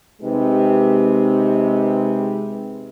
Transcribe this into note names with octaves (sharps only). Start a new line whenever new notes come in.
C3 G#3 D#4 G4 B4